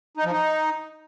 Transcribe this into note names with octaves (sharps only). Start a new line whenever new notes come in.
D#4
F3
D#4